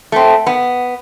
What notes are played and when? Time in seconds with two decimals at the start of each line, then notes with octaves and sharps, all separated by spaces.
0.12 A3 C4
0.47 B3